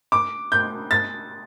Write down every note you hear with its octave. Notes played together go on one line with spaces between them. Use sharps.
D6
G6
A6